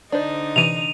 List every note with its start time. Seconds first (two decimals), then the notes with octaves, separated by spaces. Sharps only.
0.12 D3 D4 D#4 C5
0.56 C3 E3 D#7 F7